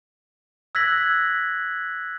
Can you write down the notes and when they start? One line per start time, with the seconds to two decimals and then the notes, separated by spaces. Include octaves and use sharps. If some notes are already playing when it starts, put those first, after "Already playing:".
0.75 E6 F#6 G#6 A#6 B6 F#7